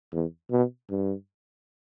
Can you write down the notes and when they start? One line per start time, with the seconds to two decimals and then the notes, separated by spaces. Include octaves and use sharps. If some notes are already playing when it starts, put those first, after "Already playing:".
0.12 E2
0.51 B2
0.90 G2